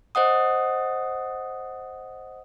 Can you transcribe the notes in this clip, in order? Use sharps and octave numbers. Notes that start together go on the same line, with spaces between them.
C5 D#5 F#5 D#6